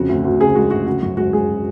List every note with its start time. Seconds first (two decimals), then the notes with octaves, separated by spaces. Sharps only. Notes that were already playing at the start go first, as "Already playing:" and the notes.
Already playing: F2 C#3 F#4
0.09 D2
0.25 D2
0.40 C#3 G#4
0.55 G#3 F#4
0.70 D2 F#4
0.87 C#3 F#4
1.02 F#2 F#4
1.17 G#3 F#4
1.33 G#3 G#4